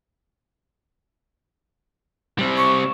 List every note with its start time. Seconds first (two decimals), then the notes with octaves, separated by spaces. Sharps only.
2.39 G3 C4
2.57 C#6